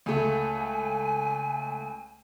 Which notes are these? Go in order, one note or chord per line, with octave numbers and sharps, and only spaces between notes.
C#2 A3 G#5